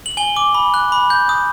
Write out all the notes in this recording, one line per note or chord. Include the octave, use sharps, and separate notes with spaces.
F#7
G#5 G7
D6
B5
F#6
B5
G6
D#6